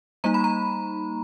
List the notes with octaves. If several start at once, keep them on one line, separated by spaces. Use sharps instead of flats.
G3 A#3 D#4 A#5
B5
A#5